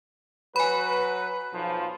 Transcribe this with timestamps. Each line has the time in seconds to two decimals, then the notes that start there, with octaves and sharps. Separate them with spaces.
0.56 F#3 B4 G#5 B5
1.53 B1 F3